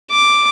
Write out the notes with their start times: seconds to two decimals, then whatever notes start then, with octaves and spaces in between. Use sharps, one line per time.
0.11 D6